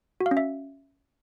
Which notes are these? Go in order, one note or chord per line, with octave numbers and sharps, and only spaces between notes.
F#4
F5
C#4
E5